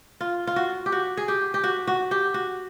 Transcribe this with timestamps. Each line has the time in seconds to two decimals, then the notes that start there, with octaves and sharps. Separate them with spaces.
0.21 F4
0.47 F4
0.56 F#4
0.86 G4
0.92 F#4
1.17 G#4
1.28 G4
1.54 G4
1.64 F#4
1.87 F#4
2.11 G4
2.34 F#4